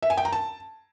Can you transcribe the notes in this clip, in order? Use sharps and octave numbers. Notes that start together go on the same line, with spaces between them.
E5
G#5
G5
A#5
A5